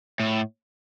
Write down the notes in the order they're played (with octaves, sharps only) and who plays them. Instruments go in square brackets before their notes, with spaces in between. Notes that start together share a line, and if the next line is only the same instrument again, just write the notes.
[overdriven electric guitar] A2